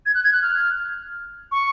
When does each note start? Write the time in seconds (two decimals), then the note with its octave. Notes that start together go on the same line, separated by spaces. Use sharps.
0.06 G#6
0.14 F#6
0.24 G#6
0.33 F#6
0.42 F6
1.52 C#6